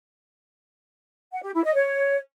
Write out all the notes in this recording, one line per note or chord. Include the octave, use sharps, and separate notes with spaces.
F#5
G4
E4
D#5
C#5